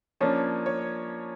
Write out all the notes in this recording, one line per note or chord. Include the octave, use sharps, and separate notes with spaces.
F3 A#3 C#4 D4 C#5
C#5